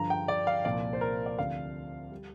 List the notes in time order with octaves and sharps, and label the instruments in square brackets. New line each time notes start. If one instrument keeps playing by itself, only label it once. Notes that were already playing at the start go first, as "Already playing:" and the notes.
Already playing: [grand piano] G2 D3 F3 A#5
G5
D5
F5
C2 A#2 F3 D5
C5
A#4
D5
D2 C3 F3 F5
G3